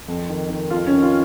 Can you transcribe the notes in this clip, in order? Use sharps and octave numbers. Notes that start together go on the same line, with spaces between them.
F2
D#3
D#3
F2 F4
C#4
D#3
F4